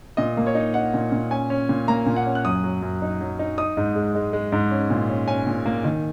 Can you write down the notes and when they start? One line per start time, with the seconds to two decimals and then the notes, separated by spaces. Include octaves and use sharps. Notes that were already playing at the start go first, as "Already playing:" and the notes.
0.17 A#2 D#5
0.37 A#3
0.47 C#5
0.55 D#4
0.74 D#4 F#5
0.94 A#2
1.12 A#2
1.31 C#4 G#5
1.50 C#4
1.69 A#2
1.88 A#3 A#5
2.07 A#2
2.16 F#5
2.26 C#4
2.35 F#6
2.45 F#2 D#6
2.64 F#3
2.82 F#2
3.02 D#4
3.21 F#3
3.39 D#4
3.58 D#4 D#6
3.77 G#2
3.96 G#3
4.15 G#3
4.33 G#3
4.52 G#2
4.71 C#4
4.90 A#2
5.09 C#4
5.28 C#4 G#5
5.47 A#2
5.66 A#3
5.84 D#3